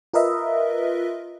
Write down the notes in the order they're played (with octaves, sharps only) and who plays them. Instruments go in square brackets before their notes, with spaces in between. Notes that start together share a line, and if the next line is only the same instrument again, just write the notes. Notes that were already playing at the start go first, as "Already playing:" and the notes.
[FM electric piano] F4 A#4 B4 D#5 E5